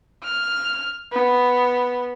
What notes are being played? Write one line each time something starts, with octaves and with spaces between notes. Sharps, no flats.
F6
B3